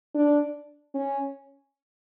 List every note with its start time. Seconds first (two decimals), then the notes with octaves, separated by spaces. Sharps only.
0.15 D4
0.95 C#4